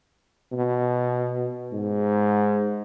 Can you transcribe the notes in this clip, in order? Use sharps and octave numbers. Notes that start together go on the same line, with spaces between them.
B2
G#2